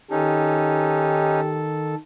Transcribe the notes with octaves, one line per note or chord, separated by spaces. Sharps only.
D#3 C#4 D#4 G4 A4